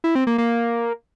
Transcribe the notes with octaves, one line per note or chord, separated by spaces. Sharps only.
E4
C4
A#3
A#3